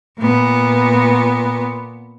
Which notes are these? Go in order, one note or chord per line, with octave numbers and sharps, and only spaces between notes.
A#2 B3